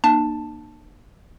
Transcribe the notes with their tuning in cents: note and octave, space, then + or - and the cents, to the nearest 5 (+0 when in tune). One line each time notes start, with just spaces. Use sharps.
A#3 +20 D#4 -45 A5 +0